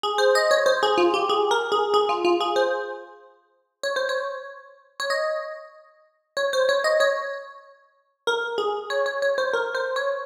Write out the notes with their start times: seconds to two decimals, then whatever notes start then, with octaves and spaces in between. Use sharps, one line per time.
0.03 G#4
0.18 C5
0.35 D#5
0.51 C#5
0.66 C5
0.83 G#4
0.98 F4
1.14 G4
1.29 G#4
1.51 A#4
1.72 G#4
1.94 G#4
2.09 F4
2.25 F4
2.40 G#4
2.56 C5
3.83 C#5
3.96 C5
4.09 C#5
5.00 C#5
5.10 D#5
6.37 C#5
6.53 C5
6.69 C#5
6.84 D#5
7.00 C#5
8.27 A#4
8.58 G#4
8.90 C#5
9.06 C#5
9.22 C#5
9.38 C5
9.53 A#4
9.75 C5
9.96 C#5